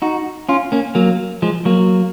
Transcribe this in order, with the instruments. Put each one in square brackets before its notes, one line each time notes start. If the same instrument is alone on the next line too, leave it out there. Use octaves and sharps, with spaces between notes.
[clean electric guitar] D#4 F#4
C#4 F4
A#3 C#4
F#3 A#3
F3 G#3
F#3 A#3